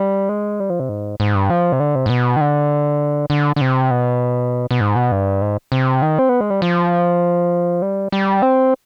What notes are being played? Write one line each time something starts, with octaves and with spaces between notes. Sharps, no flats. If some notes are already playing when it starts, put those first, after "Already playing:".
Already playing: G3
G#3
G3
F3
C3
G#2
G#2
G2
F3
C3
D3
C3
G#2
B2
D#3
D3
D3
D3
C3
B2
B2
G#2
B2
G2
G#2
C3
D#3
C4
B3
G#3
G3
F3
G3
G3
C4